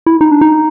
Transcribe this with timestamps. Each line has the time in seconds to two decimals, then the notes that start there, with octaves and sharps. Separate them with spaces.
0.06 E4
0.21 D#4
0.31 D4
0.41 D#4